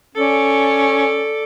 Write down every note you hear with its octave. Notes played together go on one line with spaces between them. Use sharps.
C#4 A4 D5